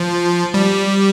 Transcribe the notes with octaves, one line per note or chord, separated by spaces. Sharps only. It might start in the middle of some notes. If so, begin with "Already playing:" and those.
Already playing: F3
G3